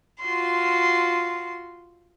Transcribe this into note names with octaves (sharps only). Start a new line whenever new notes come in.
F4 F#4 C6